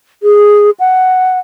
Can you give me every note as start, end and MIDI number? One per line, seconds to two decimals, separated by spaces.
0.23 0.70 68
0.80 1.39 78